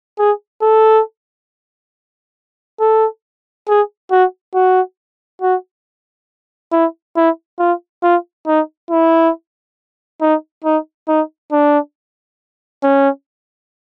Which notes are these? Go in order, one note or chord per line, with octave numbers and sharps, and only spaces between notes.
G#4
A4
A4
G#4
F#4
F#4
F#4
E4
E4
F4
F4
D#4
E4
D#4
D#4
D#4
D4
C#4